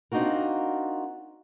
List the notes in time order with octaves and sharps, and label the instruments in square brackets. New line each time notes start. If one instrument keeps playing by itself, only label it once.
[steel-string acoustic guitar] C4 D4 D#4 F4 F#4 A#4